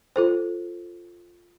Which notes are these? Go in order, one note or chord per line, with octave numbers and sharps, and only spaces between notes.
F4 A4 C5